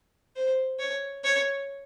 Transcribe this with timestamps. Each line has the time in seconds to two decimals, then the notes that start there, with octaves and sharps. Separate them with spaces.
0.36 C5
0.79 C#5
1.24 C#5